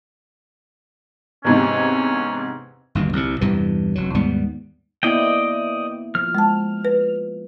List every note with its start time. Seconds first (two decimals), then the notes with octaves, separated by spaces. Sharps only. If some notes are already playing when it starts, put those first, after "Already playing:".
1.45 E2 G#2 C3 C#4
2.95 G1 D#2 B2
3.13 C2 C3
3.41 E2 G2 C3 E3
3.95 F1 F#3
4.15 D#2 G#2 G3 B3
5.03 A#3 B3 E4 D5 D#5 G5
6.15 F3 F6
6.35 G#3 A5
6.85 B4